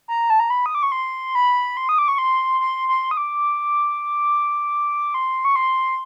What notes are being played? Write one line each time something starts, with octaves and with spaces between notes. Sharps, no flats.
A#5
A5
A#5
B5
D#6
D6
C#6
C6
B5
C6
D#6
D6
C#6
C6
C6
C6
D#6
D6
C6
C#6
C6